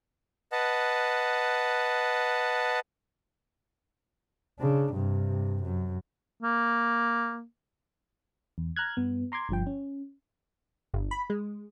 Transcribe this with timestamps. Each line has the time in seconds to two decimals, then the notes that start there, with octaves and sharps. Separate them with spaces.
0.52 B4 D#5 F#5 A5
4.59 C#3 D4
4.94 G2 C3
5.63 F#2
6.43 A#3
8.58 E2
8.76 A#5 F6 F#6 G#6
8.97 G2 B3
9.32 A#5 C6 D6 G#6
9.49 G1 G2 F3 G5
9.67 C#4
10.94 G1
11.11 B5
11.30 G#3